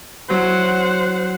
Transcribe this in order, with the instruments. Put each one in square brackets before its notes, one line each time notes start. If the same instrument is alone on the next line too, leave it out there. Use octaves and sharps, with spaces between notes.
[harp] F#3 E4 [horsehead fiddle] C5 F#5